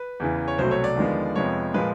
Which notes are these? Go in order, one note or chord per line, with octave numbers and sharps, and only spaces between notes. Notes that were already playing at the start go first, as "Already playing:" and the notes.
Already playing: B4
E2 C#3 E3
C#5
C2 B2 F#3 A3 C5
C#5
D5
D#2 D3 F3 G#3 B3
F2 C3 F3 G#3 B3 C#5
A#2 F3 G#3 B4